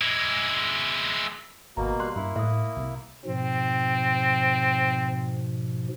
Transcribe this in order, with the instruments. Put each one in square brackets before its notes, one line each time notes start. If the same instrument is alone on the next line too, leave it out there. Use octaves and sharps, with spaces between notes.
[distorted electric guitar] G#3 E4
[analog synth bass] G#1 [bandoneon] B2 A#3 [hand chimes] A#5
[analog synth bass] G3 [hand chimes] C6 F#6
[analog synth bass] G2 [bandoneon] A#3 E4
[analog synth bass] A2 [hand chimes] E5 D#6
[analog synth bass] C2
[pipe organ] G#2 B2 F3 [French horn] C4